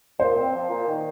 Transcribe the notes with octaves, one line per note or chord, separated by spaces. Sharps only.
A#2 C5
C4
F3
A#2
D#3